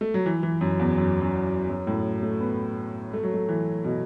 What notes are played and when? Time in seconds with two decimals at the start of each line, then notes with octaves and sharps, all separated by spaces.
0.01 A3
0.14 F#3
0.26 E3
0.43 E3
0.61 F#2
0.79 E2
0.98 F#2
1.21 F#2
1.69 F#2
1.87 A2
2.23 A3
2.41 B3
3.13 A3
3.23 F#3
3.34 A3
3.49 E3
3.84 B2